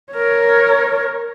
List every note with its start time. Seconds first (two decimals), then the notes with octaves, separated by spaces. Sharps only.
0.13 A#4 C#5